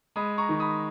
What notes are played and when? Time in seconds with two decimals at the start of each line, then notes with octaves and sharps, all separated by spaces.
0.16 G#3 B5 D#6
0.38 A#5 C#6
0.49 D#3
0.60 B5 D#6